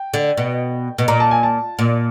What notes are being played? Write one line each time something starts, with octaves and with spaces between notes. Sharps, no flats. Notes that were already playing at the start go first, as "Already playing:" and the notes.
Already playing: G5
D3
B2
B2
A#2 A#5
A5
G#5
A5
A#2